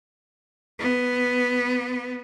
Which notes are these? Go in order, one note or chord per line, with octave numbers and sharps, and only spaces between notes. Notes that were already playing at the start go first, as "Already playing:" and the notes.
B3